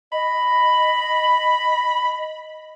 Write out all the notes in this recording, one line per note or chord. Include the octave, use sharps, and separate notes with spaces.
D#5 B5